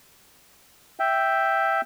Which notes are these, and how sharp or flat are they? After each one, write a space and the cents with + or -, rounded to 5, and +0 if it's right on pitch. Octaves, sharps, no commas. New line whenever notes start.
E5 +0 G5 +0